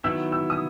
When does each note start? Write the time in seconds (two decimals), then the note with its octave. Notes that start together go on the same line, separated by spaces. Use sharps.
0.04 D#3 F#3 B3 E4 E6
0.32 E6
0.50 D#6